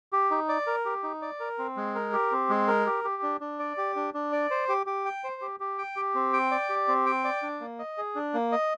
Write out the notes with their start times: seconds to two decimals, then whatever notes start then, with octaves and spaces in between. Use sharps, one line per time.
0.13 G4
0.31 D#4
0.49 D5
0.67 A#4
0.85 G4
1.03 D#4
1.22 D5
1.40 A#4
1.58 C4
1.77 G#3
1.95 A#4
2.13 G4
2.32 C4
2.50 G#3
2.68 A#4
2.86 G4
3.04 G4
3.23 D4
3.41 D4
3.59 D5
3.78 G4
3.96 D4
4.14 D4
4.32 D5
4.51 C5
4.69 G4
4.86 G4
5.05 G5
5.24 C5
5.42 G4
5.60 G4
5.78 G5
5.96 G4
6.15 C4
6.33 G5
6.51 D5
6.69 G4
6.88 C4
7.06 G5
7.24 D5
7.42 D4
7.61 A#3
7.79 D#5
7.98 G#4
8.15 D4
8.34 A#3
8.52 D#5